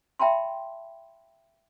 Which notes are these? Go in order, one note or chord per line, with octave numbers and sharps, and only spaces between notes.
E5 G5 A5 B5 C6